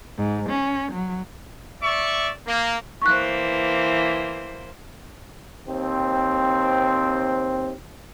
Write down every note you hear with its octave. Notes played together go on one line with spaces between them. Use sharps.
G#2
C#4
F#3
D5 E5 C#6
A#3
E3 A#3 C5 C#6 F#6
D#2 C4